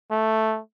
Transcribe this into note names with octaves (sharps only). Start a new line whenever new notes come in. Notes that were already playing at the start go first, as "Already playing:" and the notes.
A3